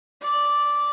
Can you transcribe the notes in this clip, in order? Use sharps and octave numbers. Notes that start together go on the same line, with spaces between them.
D5